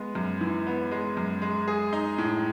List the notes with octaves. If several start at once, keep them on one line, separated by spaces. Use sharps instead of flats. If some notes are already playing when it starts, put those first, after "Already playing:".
Already playing: G#3 B3
F#2
E3
B3
G#3
F#2
G#3
G#4
D#4
A2